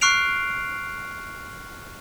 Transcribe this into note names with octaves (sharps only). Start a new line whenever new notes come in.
C#6 F6 F#6 C7 D7 F7